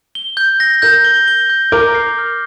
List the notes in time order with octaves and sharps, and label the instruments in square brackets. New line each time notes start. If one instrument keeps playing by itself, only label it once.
[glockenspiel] G7
G6
A#6
[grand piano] A#4 [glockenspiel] G6
[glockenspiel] G7
G7
G6
[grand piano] A#4 [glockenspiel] D6
[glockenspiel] C7
F6